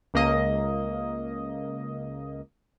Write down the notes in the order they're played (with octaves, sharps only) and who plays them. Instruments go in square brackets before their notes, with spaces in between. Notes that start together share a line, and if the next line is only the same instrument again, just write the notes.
[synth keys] C#2 A#3 D#5